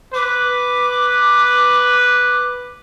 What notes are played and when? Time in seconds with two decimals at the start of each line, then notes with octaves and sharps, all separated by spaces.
0.14 B4 D6